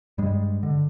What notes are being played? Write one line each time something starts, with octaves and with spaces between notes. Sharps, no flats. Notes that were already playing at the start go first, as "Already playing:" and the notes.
G2 G3 G#3
D3